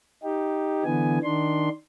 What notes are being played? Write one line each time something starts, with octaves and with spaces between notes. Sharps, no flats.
D#4 G4
D3 E3 B3 G#5
D#3 D4 C6